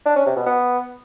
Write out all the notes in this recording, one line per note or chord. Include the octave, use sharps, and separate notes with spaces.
D4
C#4
C3
B2
B3